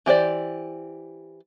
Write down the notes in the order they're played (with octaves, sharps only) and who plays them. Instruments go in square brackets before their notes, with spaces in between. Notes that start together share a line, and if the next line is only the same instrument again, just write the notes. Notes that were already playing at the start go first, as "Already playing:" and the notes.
[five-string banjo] E3 G4 C5 D5